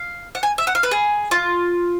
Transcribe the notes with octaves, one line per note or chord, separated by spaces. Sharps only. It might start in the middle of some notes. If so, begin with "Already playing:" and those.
Already playing: F5
F#5
G#5
E5
F#5
F5
B4
G#4
F4